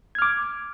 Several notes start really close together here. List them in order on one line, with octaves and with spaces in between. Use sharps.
G#6 F6 D6